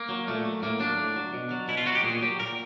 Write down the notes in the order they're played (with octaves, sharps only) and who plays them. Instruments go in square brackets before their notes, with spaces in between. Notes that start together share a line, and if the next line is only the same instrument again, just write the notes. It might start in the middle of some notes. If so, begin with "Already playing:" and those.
Already playing: [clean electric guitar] A#3
F#3
A#2 A3
F#3
A2 A#3
F#3 D4
A2
F#3
B2
F#3
B2 E4
F4
F#3 F#4
G4
A#2 G#4
F#3 G4
A#2 A#4